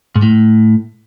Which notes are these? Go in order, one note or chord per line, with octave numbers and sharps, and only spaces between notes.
G#2
A2